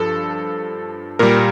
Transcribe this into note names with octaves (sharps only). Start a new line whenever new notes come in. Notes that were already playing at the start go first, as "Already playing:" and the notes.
Already playing: G2 F3 A4
A#2 G3 A#4